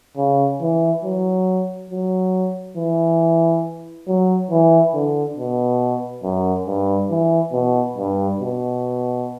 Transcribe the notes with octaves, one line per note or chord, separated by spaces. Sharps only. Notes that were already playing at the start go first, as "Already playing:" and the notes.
C#3
E3
F#3
F#3
E3
F#3
E3
D3
B2
F#2
G2
E3
B2
G2
B2